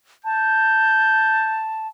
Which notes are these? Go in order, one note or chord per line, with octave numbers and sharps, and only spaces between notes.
A5 G6